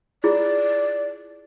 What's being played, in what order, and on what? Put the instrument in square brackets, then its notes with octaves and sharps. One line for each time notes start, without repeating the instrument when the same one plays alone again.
[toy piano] E4 F4 G#4 [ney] D5